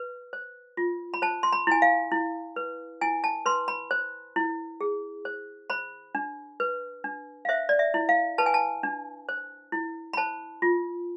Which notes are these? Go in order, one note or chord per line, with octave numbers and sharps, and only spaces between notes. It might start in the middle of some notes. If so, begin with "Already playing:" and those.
Already playing: B4
C5
F4
B5
C5 A5
C6
B5
E4 G#5
F5
E4
B4
E4 G#5
A5
B4 C6
B5
C5
E4
G#4
C5
C5 B5
D4
B4
D4
F5
C5 E5
D5
E5
E4
F5
B4 A5
G#5
A5
D4
C5
E4
B5
C5 A5
F4